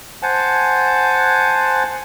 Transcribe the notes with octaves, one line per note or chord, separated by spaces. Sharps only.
C5 F#5 G#5 A5